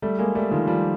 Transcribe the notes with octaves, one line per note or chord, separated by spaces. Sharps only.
G3 A3
G#3 A#3
G3 A3
D#3 F3
F3 G3